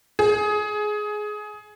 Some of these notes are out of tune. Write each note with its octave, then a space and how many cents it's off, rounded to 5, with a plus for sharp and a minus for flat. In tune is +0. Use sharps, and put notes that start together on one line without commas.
G#4 +15